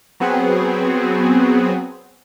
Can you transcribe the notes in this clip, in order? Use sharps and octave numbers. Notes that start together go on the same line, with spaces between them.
F#3 B3 C4 F#4 G#4